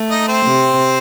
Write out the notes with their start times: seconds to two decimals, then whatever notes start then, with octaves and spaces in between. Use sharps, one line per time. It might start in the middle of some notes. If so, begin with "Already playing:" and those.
Already playing: A3
0.11 D#4 D#5
0.28 C4 C5
0.46 C3